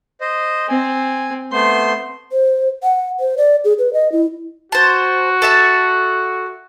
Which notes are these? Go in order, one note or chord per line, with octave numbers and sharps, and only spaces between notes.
C5 D#5
C4 G#5
A3 B3 C5 C6
C5
F#5
C5
D5
G#4
B4
D#5
E4
F#4 C5 A5
A4 E5 A5